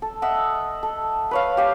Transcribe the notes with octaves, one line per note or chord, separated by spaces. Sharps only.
A4
D#5 E5 F#5 E6
A4
B4 C#5 F5
G4 F5 G5